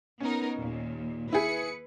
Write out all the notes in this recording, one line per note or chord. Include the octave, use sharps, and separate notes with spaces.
B3 C#4 D#4 A#4
D#2 A#2
E4 G#4 B4 C#7